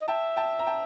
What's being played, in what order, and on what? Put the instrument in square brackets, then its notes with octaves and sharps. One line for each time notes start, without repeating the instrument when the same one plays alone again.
[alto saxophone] D#5
[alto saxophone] E5 [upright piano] G5 A5
[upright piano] G5 A5
A#5
G5 A5